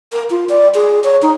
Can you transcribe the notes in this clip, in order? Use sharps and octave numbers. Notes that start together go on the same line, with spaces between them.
A#4
F4
D5
G#4
C#5
D#4